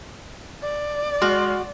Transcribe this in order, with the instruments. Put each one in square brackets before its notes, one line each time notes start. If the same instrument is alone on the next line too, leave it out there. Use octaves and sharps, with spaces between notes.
[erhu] D5
[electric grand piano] G#3 C6 F6 [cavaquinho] F#4